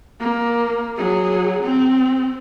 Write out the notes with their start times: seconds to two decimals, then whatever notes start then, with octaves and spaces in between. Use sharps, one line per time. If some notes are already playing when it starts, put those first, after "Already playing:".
0.20 A#3
0.97 F#3 G#4
1.64 C4